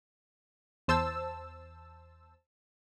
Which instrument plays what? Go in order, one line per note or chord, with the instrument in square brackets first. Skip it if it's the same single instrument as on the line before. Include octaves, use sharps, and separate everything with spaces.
[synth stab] E2 C5 A5 E6